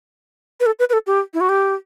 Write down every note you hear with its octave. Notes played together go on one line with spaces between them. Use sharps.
B4
A4
B4
B4
A4
G4
E4
F#4
G4